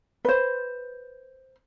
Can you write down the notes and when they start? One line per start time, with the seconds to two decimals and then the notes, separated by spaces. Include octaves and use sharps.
0.25 B4 C5